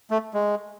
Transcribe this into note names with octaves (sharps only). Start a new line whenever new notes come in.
A3
G#3